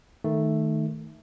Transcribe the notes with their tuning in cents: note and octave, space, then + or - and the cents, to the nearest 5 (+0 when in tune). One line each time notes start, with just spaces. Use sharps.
D#3 +0 A3 +0 D#4 +0